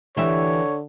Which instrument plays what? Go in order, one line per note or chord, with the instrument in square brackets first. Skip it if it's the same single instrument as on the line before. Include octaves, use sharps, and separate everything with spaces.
[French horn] D3 [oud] E3 G4 E5 [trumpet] C#5